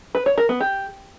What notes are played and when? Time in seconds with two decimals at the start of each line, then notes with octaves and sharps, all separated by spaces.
0.15 B4
0.26 C#5
0.38 A#4
0.49 B3
0.60 G4